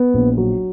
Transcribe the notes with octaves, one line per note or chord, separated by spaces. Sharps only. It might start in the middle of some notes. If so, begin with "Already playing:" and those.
Already playing: B3
A#1
F#3